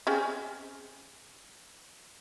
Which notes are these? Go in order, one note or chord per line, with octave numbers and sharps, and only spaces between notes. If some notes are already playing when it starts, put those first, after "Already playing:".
C4 C#4 G#4